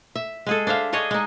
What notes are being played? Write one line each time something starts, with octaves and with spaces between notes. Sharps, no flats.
E5
G#3 G#4 A4
D4 C5 E5 F5
D4 G#4 C#5 D#5
G#3 D#4